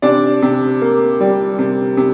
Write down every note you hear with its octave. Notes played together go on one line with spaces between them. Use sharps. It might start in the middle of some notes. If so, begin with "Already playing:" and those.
C3 D4 D5
C3
A#3
G3
C3
C3